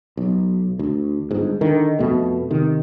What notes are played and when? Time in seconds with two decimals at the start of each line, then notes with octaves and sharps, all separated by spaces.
0.17 B1
0.79 D2
1.31 G1 G#2
1.61 D3 D#3
1.99 F2 B2 A3
2.51 C3 D#3